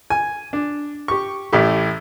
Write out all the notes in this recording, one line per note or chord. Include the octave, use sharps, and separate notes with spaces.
G#5
D4
G4 C#6
A1 A2 G4